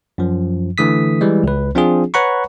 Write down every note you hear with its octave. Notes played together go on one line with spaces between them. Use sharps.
F#2 F3
D3 E3 A3 D#6 B6
E3 G3 G#3
C#2 B4
F3 C4 D4 F4 G#4
B4 C#5 F#5 A#5 B5 C#6